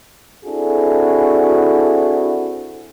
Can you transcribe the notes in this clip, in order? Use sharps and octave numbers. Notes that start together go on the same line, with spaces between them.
C4 D4 E4 F#4 G#4 A4